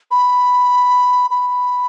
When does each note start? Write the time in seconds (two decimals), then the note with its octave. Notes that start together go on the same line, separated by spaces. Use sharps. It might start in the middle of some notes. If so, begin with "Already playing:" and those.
0.11 B5
1.31 B5